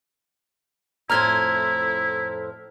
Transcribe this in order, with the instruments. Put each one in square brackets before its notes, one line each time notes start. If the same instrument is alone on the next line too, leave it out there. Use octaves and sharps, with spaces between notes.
[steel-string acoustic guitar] F2 A2 C5 [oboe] E4 [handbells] A#5 F6 G#6